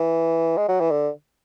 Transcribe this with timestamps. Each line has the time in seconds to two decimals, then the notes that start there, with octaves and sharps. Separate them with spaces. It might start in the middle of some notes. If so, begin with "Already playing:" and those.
Already playing: E3
0.57 G#3
0.68 F#3
0.80 E3
0.91 D3